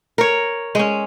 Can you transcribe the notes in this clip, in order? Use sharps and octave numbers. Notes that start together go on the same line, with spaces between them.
A#4 C#5
G#3 C#4